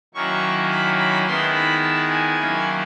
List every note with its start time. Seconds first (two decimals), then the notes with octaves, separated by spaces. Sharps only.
0.14 D#3 F#3 A#3 C#4 E4 C#6
0.70 B5
0.99 B5
1.27 D#3 G#3 B3 E4 C6
1.55 B5
1.82 A5
2.11 G#5
2.38 D#3 F#3 A#3 C#4 E4